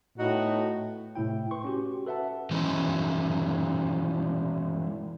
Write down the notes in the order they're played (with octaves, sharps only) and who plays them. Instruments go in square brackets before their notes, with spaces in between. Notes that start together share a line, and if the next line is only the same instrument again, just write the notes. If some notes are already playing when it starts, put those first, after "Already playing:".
[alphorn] A2 [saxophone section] B3 D#4 F#4
[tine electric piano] A2 C3 E4 G5
B4 C6 C#6
C#4 F#4 G4
A4 B4 E5 F#5 A5
[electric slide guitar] D#3 E3 G#3 C#4 D#4